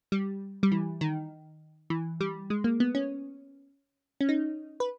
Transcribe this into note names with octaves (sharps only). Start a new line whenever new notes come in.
G3
G3
E3
D#3
E3
G3
G#3
A#3
B3
C#4
C#4
D#4
B4